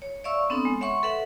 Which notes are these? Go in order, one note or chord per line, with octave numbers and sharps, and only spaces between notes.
C#5
D5 E5 F5 C#6 E6
B3 C4 D4 A4 D#6
G#3
C#5 E5 F#5 C6 C#6
A4 B4 E5 F#5